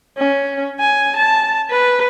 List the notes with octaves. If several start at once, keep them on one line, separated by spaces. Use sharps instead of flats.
C#4
G#5
A5
B4